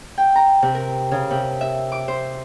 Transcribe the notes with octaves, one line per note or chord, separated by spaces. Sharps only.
G5
A#5
C3
A#4
C#3
C3
E5
D6
C5